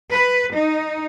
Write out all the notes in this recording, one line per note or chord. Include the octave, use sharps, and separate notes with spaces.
B4
D#4